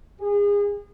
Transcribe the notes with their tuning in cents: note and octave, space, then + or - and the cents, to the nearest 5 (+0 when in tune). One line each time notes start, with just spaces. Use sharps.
G#4 -30